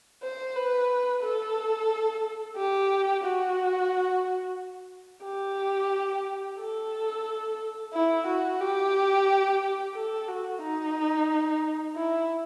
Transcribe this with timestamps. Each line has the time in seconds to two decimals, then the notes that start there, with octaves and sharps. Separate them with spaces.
0.23 C5
0.55 B4
1.22 A4
2.56 G4
3.24 F#4
5.25 G4
6.59 A4
7.93 E4
8.26 F#4
8.60 G4
9.94 A4
10.28 F#4
10.61 D#4
11.96 E4